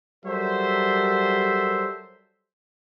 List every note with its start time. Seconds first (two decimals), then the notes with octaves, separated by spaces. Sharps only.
0.25 F#3 G3 A4 A#4 C5 E5